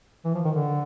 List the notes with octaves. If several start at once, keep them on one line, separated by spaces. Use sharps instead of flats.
E3
F3
D#3
D3